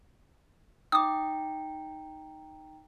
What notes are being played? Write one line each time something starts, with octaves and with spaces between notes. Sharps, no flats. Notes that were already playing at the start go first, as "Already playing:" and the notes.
D#4 G5 A#5 D6 D#6